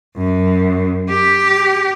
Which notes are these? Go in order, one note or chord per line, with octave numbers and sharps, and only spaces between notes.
F#2
G4